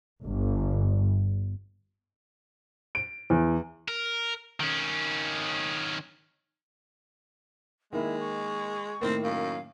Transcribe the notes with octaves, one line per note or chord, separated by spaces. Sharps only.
G1
D7
E2
A#4
D#3 C#4
D#3 G#3 A#3 E4
C#6
A2 D#3 A#3 C4
F#2 F5